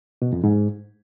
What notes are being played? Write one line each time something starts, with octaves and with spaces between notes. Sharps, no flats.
B2
F2
G#2